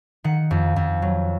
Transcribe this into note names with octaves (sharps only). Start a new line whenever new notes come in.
D#3 F#5
F2
F2
F#3